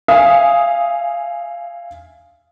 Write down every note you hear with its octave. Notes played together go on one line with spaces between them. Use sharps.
E5 F5 G#5 D#6